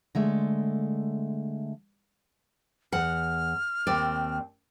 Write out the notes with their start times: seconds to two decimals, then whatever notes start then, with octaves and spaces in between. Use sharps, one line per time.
0.15 D3 G#3 A3
2.92 E2 F#5 F6
3.87 D#2 C4 D5